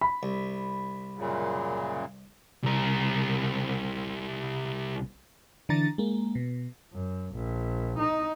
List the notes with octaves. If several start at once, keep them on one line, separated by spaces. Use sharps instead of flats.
B5
C2
F#2 A#2 C#3
C2 A#4
D3 E3 D4 A#5 A6
G#3 A#3
B2
F#2
A#1
D#4